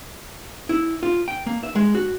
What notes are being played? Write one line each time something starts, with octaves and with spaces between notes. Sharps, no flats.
E4
F4
G5
A#3
E5
G#3
F#4